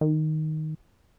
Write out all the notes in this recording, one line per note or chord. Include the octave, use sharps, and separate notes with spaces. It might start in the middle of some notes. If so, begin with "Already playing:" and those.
D#3